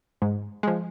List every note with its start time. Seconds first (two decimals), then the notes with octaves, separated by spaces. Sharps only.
0.22 G#2
0.63 F3 G#3